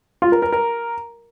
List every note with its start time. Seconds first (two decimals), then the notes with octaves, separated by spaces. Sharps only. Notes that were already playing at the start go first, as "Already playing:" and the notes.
0.22 F4
0.32 A#4
0.42 A#4
0.52 A#4